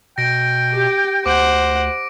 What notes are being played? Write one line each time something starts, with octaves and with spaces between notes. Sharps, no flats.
B2 G5 A#6 D7
G4
D2 C5 F#5 D6 D7